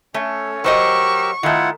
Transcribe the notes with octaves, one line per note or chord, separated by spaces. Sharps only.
A3 C#4 C#5
F#3 G4 A#4 C5 D#5 C#6 E6
D#3 A3 E4 F4 F#5